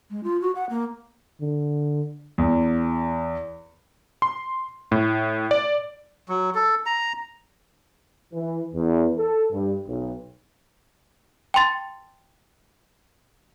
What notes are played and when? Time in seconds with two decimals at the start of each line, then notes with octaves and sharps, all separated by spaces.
0.10 G#3
0.24 F4
0.41 F#4
0.55 F#5
0.70 A#3
1.41 D3
2.38 E2
4.22 C6
4.92 A2
5.51 D5
6.29 F#3
6.55 A4
6.86 A#5
8.32 E3
8.73 E2
9.17 A4
9.51 G2
9.87 B1
11.54 G5 A5 C6 A6